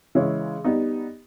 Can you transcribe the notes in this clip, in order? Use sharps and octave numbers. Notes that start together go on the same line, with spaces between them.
C#3 E3 G#3 C#4 E4
G3 B3 D#4